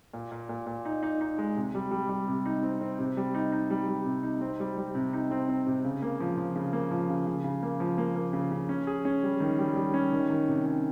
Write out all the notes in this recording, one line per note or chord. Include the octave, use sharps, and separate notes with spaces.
A#2
A#2
A#2
A#2
D#4
D#4
D#4
G#3
C3
G3
G3
G3
C3
D#4
C4
C4
C3
G3
D#4
D#4
G3
G3
C3
D#4
C4
G3
G3
C3
D#4
C4
C4
C3
C#3
A#3
F3
F3
C#3
A#3
F3
C#3
C#3
C#3
A#3
F3
A#3
A#3
C#3
C#3
C#4
G#4
C#4
G3
D#3
G3
G3
C#4
D#3
D#3
C3
C#4